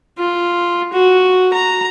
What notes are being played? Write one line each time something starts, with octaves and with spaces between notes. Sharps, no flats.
F4
F#4
A#5